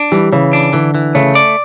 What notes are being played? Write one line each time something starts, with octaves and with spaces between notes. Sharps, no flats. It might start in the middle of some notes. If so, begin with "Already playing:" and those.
Already playing: D4
E3 G3
C#3 E3
D4
D3 E3
E3
C#3 A3
D5